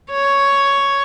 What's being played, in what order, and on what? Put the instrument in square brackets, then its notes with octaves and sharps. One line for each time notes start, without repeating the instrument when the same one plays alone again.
[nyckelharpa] C#5